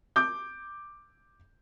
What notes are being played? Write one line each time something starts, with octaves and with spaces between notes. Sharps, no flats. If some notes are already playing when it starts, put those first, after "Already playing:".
D6 G6